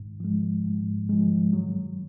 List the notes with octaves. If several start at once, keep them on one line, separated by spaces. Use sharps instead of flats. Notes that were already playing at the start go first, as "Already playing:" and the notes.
Already playing: G#2
F3 G#3
G#2
F3 G#3
F#3